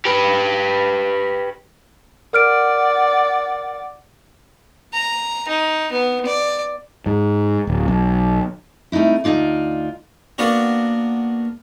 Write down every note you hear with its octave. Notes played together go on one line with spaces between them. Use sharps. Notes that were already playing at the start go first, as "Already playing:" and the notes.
G4 B4
A#4 D5 F#5 F6 D7
A#5
D#4
B3
D5
G#2
D1
B1
G3 A3 C4 D#4 E4
D2 B2 D#4 F4 D5
A#3 B3 D4 F#4